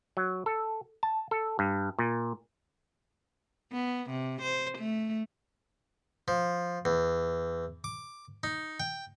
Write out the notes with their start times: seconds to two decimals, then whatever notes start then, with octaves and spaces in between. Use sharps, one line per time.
0.17 F#3
0.46 A4
1.03 A5
1.31 A4
1.59 G2
1.99 A#2
3.72 B3
4.10 C3
4.42 C5
4.78 A3
6.28 F3
6.85 E2
7.84 D6
8.43 D#4
8.80 G5